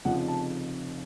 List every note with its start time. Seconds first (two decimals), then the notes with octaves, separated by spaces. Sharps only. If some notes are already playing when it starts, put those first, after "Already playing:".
0.05 F1 F2 C#3 F3 F#5
0.28 A5